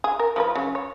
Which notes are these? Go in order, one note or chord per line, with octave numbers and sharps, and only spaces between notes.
G#4
A#4
F3 A#4 B4
C#3 F#3
C#5